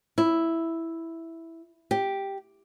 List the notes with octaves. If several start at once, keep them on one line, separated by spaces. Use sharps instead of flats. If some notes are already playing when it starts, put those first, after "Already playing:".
E4
G4